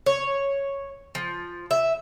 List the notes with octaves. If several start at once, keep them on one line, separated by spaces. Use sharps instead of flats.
C#5
F3
E5